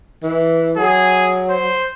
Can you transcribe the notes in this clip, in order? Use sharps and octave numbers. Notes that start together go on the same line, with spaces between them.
E3
F#3 G#4
C5